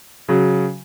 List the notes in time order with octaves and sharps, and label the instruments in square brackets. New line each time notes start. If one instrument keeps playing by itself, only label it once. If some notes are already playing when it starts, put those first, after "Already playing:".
[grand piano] C#3 F#3